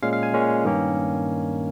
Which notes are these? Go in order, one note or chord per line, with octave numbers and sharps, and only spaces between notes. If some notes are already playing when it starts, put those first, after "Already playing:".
A#2 G#3 C#4 F5
F5
G#5
A#2 G#3 C#4
G2 D#3 A#3 C#4